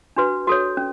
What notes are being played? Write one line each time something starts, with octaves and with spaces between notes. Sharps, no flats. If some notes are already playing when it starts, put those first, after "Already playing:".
D4 F#4 B4
F#4 A4 C#5
C#4